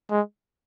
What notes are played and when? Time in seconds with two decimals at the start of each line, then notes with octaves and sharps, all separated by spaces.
0.11 G#3